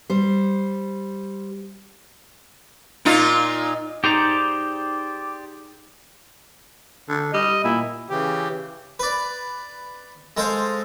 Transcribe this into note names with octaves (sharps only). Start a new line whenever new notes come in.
G3 C5
A#2 D#4 F4
D#4 G4 G#4 C5 D5 A#5
D3
G3 D#5
A#2 E4
C#3 E3 G4
B4 D5
G#3 A4 C5 F5